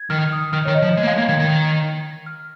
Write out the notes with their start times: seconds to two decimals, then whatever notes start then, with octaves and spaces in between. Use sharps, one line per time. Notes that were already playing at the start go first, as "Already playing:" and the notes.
Already playing: G#6
0.10 D#3 F6
0.32 D#6
0.53 D#3 F6
0.65 D#3 C#5
0.75 D#5
0.82 F3
0.97 G#3 D#5
1.03 A#3
1.07 G#3 F5
1.18 A#3 G#6
1.28 D#3 G#6
1.39 D#3 G#6
2.26 F6